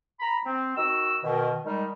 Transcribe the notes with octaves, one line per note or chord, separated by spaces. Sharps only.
A#5 B5
C4
D#3 F#4 E6
B2 D#3
D#3 G3 G#3 D#4 A#4